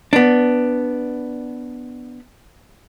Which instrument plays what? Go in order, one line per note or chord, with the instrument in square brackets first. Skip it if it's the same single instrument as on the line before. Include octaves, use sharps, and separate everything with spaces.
[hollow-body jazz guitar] B3 D4